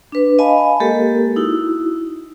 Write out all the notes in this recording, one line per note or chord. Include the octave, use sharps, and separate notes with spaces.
D4 B4
D#5 F5 G#5 A5 B5
G#3 A#3 G4 A4 A#4
D#4 E4 F#4